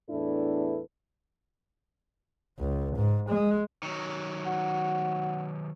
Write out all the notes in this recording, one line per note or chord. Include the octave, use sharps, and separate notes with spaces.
E2 A2 D4 E4 A4 B4
C#2
G#2
G#3
D#3 F#3
F#4